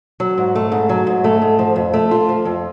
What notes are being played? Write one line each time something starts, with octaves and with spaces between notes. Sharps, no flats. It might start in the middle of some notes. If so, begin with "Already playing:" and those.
F#3
G#2
A3
G#2
F#3
G#2
A3
G#2
F3
F2
A3
F4
F3
F2